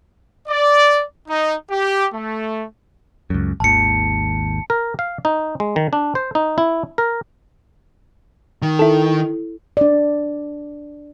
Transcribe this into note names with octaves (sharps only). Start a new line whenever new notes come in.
D5
D#4
G4
A3
C#2 F#2
G#1 D#2 A5 C#7
A#4
F5
D#4
G#3
D#3
D4
C5
D#4
E4
A#4
D#3
E4 A4
D4 D5